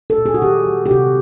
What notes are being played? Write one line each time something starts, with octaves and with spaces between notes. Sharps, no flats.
A4
A#2
G#4
F#4
D#3 G4
G3
G4
C3 F#4